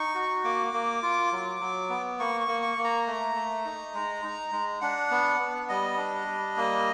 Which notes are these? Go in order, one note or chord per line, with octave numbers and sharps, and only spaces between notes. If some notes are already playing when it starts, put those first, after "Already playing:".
Already playing: D#4 C#6
F#4
A#3 D6
A#3
F4
F#3
F#3
B3
A#3 C#6
C#6
A#3
C#6
A#3
A#5
A3 A#5
A3
D#4
G#3
D#4
G#3
D4 F#5
B3
B3
G3 D#5
D4
G3
A#3